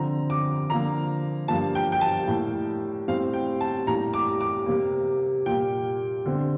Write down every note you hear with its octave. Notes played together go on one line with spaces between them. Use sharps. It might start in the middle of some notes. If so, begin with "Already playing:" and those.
Already playing: D3 F3 C4 A#5
D6
D3 F3 A#3 A#5
G2 F3 A#3 A5
G5
G5
A5
A2 G3 A#3
A2 G3 C4 F5
G5
A5
A2 G3 A#3 A#5
D6
D6
C3 G3 A#3
A#2 G3 A#3 G5
D3 G3 C4